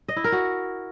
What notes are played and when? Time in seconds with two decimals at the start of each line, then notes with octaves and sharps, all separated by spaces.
0.08 D#5
0.16 E4
0.24 A#4
0.32 F#4